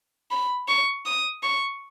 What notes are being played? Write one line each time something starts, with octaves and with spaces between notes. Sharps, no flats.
B5
C#6
D#6
C#6